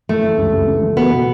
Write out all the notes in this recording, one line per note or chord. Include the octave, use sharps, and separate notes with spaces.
E3 A3
E3
C#2
C#2
C#3
E3
B3 F#4
B2